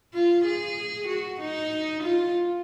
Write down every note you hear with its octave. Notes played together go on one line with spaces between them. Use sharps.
F4
G#4
F#4
D#4
F4